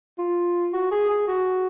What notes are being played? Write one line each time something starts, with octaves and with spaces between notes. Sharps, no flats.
F4
F#4
G#4
G#4
F#4